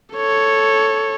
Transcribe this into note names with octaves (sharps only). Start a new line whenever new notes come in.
A4 C#5